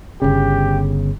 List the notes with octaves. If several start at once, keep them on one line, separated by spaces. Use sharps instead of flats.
G1 C#3 G4